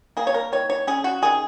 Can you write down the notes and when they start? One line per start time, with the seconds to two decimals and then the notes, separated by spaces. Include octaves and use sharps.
0.17 A#3 G#4
0.27 C#5
0.34 A#4
0.52 D#3 C#5
0.70 C#5
0.87 C#4 G#4
1.04 F#4
1.22 D#3 G#4